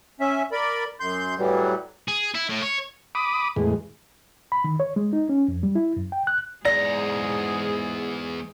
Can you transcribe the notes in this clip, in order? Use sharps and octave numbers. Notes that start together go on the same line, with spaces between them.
C#4 E5
A#4 D5 B5
F#2 C6 G6
A2 E3 F#3 G3
G#4
E4
A2
C#5
B5 D6 D#6
E2 A2 G#3
B5
D#3
C#5
G#3
D#4
C#4
F2
G3
E4
F#2
G5
F#6
E2 G#2 G#4 D5 A#5 A#6